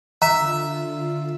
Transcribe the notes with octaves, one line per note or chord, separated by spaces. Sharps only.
D3 F4 E5 A#5